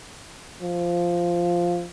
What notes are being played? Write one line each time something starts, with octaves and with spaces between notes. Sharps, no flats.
F3